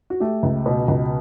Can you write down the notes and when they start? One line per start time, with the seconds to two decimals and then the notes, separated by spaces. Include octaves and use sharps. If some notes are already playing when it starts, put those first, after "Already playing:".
0.10 F#4
0.20 A3 G4
0.43 C#2
0.66 B2
0.88 C#2